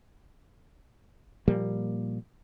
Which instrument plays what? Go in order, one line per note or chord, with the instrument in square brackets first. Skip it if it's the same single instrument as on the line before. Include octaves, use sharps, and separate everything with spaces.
[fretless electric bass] A#2 F3 G3 A#3